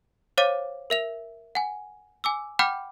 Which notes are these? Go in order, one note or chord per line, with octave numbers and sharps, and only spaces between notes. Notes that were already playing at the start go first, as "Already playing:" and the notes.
C5 C#5 F5 D6 A6 D#7
A#4 E5 F7
F#5 G#5
G#5 D6 E6
F#5 G5 B5 D6 F6 G6